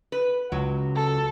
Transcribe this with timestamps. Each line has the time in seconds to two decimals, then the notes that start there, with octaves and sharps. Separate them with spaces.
0.12 B4
0.52 C#2 F#3
0.95 A4